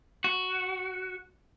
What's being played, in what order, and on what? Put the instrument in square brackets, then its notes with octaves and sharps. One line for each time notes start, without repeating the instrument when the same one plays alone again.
[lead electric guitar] F#4